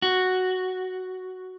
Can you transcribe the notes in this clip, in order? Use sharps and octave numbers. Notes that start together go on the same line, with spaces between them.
F#4